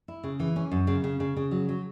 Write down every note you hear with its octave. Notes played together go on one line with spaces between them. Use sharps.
E4
C#3
E3
C#4
F#2
C#3
C#3
C#3
C#3
F#3
F#3